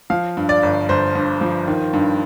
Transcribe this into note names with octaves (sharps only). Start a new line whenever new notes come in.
F3 F5
G2
D5
G1
G1 C5
G2
F3
D#3
G2